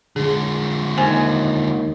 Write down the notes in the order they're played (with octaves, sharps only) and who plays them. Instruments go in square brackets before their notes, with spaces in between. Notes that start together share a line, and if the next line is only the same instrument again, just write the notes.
[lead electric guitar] D3 G#3 [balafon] G#4
[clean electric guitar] D#2 [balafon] C5 G#5